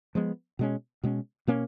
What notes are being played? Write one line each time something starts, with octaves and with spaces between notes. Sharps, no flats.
F3 G#3 B3
B2 G#3 C#4
B2 G#3 C#4
B2 A#3 C#4